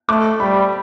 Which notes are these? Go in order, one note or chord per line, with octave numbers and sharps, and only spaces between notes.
A3 D6
G3 B5